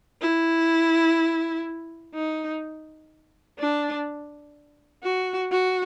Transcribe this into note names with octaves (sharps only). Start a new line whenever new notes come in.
E4
D#4
D4
F#4
F#4